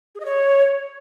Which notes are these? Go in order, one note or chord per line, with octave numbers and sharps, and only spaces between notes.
G#4
D#5
C#5